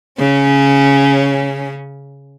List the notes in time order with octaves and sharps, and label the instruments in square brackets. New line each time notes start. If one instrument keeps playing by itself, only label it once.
[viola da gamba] C#3 C#4